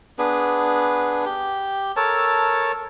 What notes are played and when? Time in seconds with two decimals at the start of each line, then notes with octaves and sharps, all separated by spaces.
0.18 B3 D4 G#4 B4
1.25 G4
1.96 A4 A#4 C#5 A5